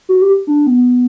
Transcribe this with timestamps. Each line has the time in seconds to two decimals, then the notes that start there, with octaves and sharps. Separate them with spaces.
0.09 F#4
0.22 G4
0.47 D4
0.66 B3